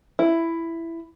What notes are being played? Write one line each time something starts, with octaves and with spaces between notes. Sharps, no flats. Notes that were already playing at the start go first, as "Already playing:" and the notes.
E4